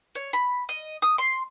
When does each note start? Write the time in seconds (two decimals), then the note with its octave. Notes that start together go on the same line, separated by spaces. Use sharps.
0.15 C#5
0.33 B5
0.69 D#5
1.02 D#6
1.18 C6